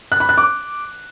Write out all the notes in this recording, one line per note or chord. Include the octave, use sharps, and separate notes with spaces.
F#6
B5
F#6
D6